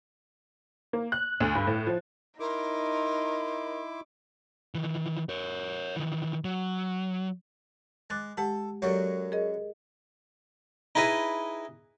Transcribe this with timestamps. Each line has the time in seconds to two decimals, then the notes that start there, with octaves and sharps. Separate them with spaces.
0.93 A#3
1.12 F#6
1.40 D2
1.55 G2
1.67 A2
1.87 F3
2.40 D#4 E4 A#4 C6 D6
4.75 D#3 E3
5.29 A#4 C#5
5.96 D#3 E3
6.44 F#3
8.10 G#3 D6 F#6 A6
8.37 G#3 G4 A4 F#5
8.82 F#2 F#3 G4 A4 D5 F#5
9.32 G#4 A#4 D#5
10.95 D#4 E4 G#4 B4 D#5